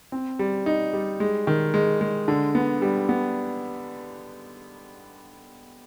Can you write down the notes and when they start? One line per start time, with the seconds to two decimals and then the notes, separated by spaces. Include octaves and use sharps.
0.12 C4
0.39 G3
0.66 D#4
0.93 G3
1.20 G#3
1.47 D#3
1.74 G#3
2.01 G#3
2.28 D3
2.55 B3
2.82 G3
3.09 B3